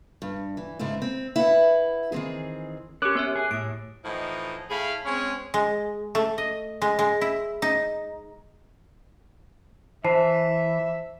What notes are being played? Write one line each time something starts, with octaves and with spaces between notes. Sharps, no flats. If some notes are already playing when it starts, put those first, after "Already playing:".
G2
E3
G#2 C#3 A3 E4
C4
E4 B4 E5 F#5
D#3 E3 A3 C4 G#4
C#4 G4 A#4 D6 F#6
B3 C#5 E5
G#4
A2 D#6 D7
A2 E3 F3 D#4
A2 E4 G#4 F5 B5
G#3 C4 C#4 G#4 C#5
G#3
A3
D#5
G#3
G#3
E4
D#4
E3 C5 E5 A5 C7